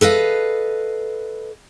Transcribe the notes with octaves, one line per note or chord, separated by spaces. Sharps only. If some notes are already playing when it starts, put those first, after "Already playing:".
A4 B4 D#5 F5